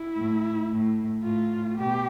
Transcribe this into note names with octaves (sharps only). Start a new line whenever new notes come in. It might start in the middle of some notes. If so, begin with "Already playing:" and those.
Already playing: E4
A2
A2
A2 F4
B2 G4